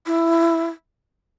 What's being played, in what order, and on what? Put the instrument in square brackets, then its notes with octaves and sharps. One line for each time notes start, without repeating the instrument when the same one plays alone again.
[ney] E4